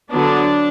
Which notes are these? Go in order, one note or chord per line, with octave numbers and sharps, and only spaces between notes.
D3 F#3 B3 D4